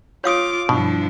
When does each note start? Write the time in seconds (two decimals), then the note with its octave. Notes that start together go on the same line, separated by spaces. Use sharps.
0.24 F4 C#5 F5 D6 D#6
0.69 G2 B2 F3 D4 E4